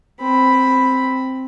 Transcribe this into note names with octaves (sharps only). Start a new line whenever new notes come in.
C4 B5